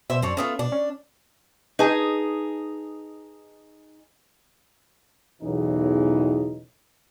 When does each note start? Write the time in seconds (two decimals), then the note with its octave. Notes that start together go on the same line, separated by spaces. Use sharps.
0.10 B2 C5 E5
0.22 F#2 C4 D4 C#5
0.37 A3 B3 C#4 F4
0.59 B2 D4
0.72 C#4
1.79 D#4 G#4 B4 A5
5.42 B1 E2 C#3 E3 C#4 D#4